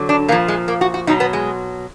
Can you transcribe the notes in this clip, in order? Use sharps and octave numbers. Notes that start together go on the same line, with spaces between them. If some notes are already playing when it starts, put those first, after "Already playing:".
Already playing: D3 F#3
D4
A#2 F3 A#3
G#3
A#3
F#4
F#4
B2 F#3 D#4
B3
G#3